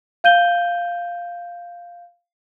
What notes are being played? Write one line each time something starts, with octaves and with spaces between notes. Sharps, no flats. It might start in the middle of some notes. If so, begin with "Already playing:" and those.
F5 G6 D#7 G7